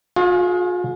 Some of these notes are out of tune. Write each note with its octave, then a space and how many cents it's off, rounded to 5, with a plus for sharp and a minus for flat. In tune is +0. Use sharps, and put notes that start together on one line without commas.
F4 +45 G#4 +20 F5 +0